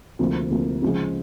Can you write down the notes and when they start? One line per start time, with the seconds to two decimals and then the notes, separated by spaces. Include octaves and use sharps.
0.19 D2 C3 F3 A#3
0.51 D2 C3 F3 A#3
0.82 C#3 F3 G#3